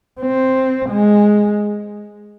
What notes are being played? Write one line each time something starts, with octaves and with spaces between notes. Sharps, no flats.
C4
G#3